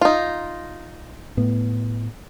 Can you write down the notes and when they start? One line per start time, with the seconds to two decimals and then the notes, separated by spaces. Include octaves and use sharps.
0.01 D#4 F4
1.37 A2 B3